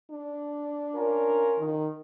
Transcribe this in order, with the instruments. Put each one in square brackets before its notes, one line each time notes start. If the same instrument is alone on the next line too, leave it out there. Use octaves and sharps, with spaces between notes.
[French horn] D4
[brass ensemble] C#4 F4 A#4
[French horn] D#3